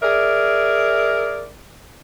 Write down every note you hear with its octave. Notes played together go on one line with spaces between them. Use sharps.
G#4 A#4 D5 E5